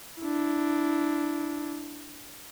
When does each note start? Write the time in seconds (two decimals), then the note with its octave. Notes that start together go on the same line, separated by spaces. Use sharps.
0.20 D4 E4